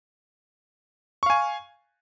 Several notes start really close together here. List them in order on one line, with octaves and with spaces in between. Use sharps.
C#6 F5 G#5